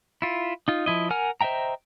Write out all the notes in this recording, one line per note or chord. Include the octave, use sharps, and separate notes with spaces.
E4 F4
D#4 F4
F3 E4 D#5
A#4 F#5 G#5 F6
C5 D#5 E5 G5 A#5